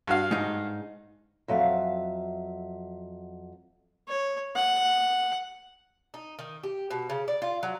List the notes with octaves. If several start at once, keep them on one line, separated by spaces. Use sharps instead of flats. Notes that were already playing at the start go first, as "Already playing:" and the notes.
G2 F#4 F5
G#2 D#4
F2 F#3 E5 F5
C#5
F#5
D#4
D#3
G4
B2
C#3
D5
F4
F#3